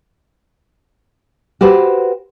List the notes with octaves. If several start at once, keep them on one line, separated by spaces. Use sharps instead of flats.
F#4 G4 B4 C5